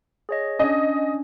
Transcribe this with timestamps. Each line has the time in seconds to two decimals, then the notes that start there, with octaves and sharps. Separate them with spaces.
0.29 G#4 C#5 D#5
0.59 C#4 D4 D#5